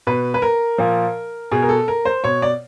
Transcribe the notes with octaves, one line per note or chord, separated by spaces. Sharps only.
B2 B4
B4
A#4
A#2 F3
B2 G#4
A#4
A4
A#4
C5
B2 C#5
D5